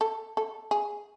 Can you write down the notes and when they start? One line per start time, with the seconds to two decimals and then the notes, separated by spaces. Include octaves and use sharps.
0.01 A4
0.37 A4
0.71 G#4